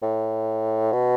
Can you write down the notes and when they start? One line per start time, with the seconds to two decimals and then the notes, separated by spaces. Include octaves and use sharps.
0.02 A2
0.92 B2